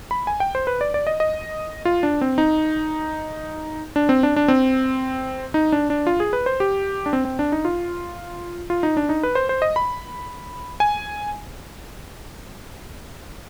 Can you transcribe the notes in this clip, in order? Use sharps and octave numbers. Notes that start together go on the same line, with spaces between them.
B5
G#5
G5
C5
B4
D5
D5
D#5
D#5
F4
D4
C4
D#4
D4
C4
D4
D4
C4
D#4
D4
D4
F4
G#4
B4
C5
G4
D4
C4
C4
D4
D#4
F4
F4
D#4
D4
D#4
B4
C5
C5
D#5
B5
G#5